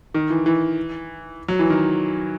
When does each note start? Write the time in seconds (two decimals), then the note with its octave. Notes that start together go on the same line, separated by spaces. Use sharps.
0.14 D#3
0.30 E3
0.46 E3
1.48 F#3
1.59 E3
1.70 D#3